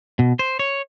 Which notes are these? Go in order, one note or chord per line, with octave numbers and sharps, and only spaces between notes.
B2
C5
C#5